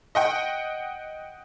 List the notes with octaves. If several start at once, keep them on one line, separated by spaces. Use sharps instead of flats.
D#5 F#5 G5